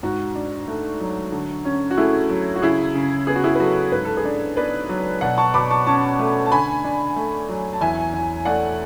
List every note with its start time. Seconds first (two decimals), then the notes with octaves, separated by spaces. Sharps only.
0.03 G#2 F#4
0.35 D4
0.67 A3
1.00 F#3
1.32 D3
1.65 C#4
1.91 F#4
1.97 A3 E4 G#4
2.30 F#3
2.56 F#4
2.62 C#3 E4 G#4
2.95 C#3
3.27 B3 G#4
3.36 F#4
3.44 E4 G#4
3.55 B4
3.59 F#3 F#4 A4
3.92 G#2 B4
4.05 A4
4.17 G#4 B4
4.25 D4
4.57 B3 B4 D5
4.89 F#3
5.21 B2 D5 F#5
5.38 A5 C#6
5.54 B2 B5 D6
5.70 A5 C#6
5.87 C#4 A5 C#6
6.19 A3
6.46 A5
6.52 D3 G#5 B5
6.84 D4
7.16 A3
7.49 F#3
7.73 A5
7.81 E2 E5 G#5
8.14 E2
8.45 A3 D5 F#5